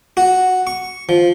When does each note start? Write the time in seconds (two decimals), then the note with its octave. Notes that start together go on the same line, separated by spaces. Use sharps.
0.17 F#4
0.67 C#6
1.09 F3